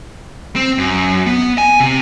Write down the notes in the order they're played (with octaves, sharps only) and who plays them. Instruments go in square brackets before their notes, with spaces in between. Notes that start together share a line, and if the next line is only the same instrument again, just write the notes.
[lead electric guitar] C4
F#2
B3
G#5
C3